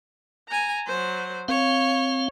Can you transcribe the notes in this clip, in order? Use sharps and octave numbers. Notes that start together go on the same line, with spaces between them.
G#5 A#5
F#3 C5
C4 C#5 F5